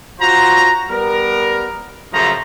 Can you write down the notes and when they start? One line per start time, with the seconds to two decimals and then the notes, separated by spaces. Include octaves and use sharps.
0.20 F4 F#4 C5 A#5
0.89 G3 B3 A#4
2.12 F#2 C#3 F3 A3 A#5